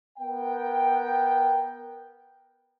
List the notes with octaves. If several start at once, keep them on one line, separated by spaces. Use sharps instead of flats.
B3 A#4 G5